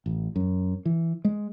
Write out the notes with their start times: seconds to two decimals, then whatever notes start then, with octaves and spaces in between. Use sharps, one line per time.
0.06 A1
0.36 F#2
0.85 E3
1.25 G#3